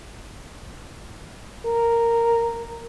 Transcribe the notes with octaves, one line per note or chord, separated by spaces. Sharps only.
A#4